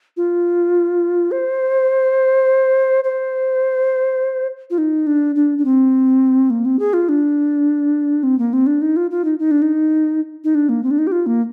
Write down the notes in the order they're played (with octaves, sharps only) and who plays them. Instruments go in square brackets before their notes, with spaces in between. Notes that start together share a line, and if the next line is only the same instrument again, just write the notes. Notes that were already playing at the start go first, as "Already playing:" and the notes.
[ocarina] F4
C5
C5
F4
D#4
D4
D4
D4
C4
A#3
C4
G#4
F4
D4
C4
A#3
C4
D4
D#4
F4
F4
D#4
D#4
D4
D#4
D#4
D4
A#3
C4
D4
D#4
G4
F4
A#3